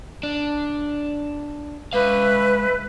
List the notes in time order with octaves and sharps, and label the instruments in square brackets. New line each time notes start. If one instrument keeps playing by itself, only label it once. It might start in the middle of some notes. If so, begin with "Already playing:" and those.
[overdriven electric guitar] D4
[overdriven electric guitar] G#3 F5 [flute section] B4 E5